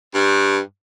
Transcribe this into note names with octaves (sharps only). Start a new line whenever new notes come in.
G2